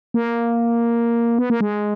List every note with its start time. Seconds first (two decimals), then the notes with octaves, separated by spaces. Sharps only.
0.14 A#3
1.39 B3
1.50 A#3
1.61 G#3